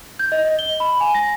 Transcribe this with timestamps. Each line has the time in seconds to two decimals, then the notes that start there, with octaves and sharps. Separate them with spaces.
0.19 G6
0.32 D#5
0.45 D#5
0.59 G7
0.80 B5
1.01 G#5
1.15 A#6